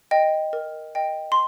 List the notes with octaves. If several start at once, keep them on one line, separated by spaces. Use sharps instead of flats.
D#5 G5
A#4
D#5 G5
C6